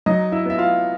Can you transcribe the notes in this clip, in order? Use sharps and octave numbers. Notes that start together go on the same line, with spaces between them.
F#3 D#4 D#5
E4 E5
B3 E5
F4 F5